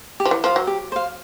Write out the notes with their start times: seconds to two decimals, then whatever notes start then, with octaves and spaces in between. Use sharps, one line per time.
0.20 G4
0.25 F3
0.31 E3
0.44 F3 C5 F5
0.56 F#3
0.67 G4
0.92 C5 F5